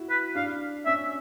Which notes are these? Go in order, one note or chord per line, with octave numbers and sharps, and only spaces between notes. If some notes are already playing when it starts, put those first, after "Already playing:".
Already playing: E4 F#4
B4
D4 F5
C#4 E5